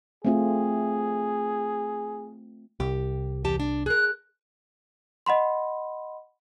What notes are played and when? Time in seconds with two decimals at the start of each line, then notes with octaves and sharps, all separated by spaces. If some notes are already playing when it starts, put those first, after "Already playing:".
0.25 A3 C4 F4 G#4
2.80 C2 G4
3.44 E2 G4 A5
3.60 D4
3.86 G#4 A#4 F#6
5.26 D#5 F#5 B5 C6